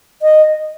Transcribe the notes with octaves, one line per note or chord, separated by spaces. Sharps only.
D#5